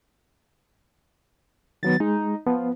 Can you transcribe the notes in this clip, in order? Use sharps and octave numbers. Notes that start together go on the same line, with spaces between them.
D#3 F#3 B3 A6
G#3 D#4
F3 B3